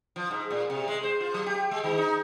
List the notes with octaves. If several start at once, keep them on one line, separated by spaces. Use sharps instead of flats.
F3
G#2
A#2
C3
G#3
C5
F4
F#3
G4
G#3
D#3
D#4